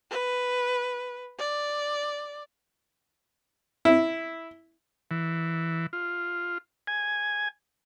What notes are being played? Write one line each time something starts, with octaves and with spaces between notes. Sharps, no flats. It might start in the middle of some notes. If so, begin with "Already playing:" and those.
B4
D5
E4
E3
F4
G#5